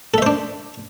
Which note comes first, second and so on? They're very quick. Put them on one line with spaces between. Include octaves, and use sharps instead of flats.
A4 E5 C5 D4